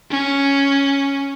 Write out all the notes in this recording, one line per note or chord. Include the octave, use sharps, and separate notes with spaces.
C#4